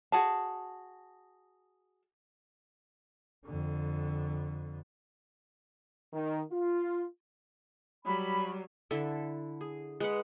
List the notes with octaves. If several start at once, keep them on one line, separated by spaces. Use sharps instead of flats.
F#4 G#4 A5
F2 D3
D#3
F4
F#3 G3 B5
D3 E4 A4
G#4
G#3 B4 F#5